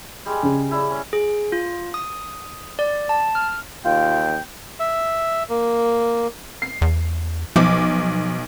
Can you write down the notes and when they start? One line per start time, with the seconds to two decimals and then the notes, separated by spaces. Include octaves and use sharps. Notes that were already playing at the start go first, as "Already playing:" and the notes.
0.26 G3 G#3 G#4
0.43 C#3
0.71 E4 D5
0.90 C#4
1.13 G#4
1.52 F4
1.94 D#6
2.79 D5
3.09 A5
3.35 F6
3.85 D#2 F4 G5
4.80 E5
5.49 A#3
6.62 C7
6.82 E2
7.56 B1 F3 D6